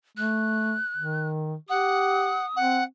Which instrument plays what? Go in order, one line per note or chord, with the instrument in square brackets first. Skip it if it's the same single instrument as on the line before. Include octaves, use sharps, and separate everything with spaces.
[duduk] A3 [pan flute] F#6
[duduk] D#3
[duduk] G4 [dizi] F#5 [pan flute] D#6
[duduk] C4 [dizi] F#5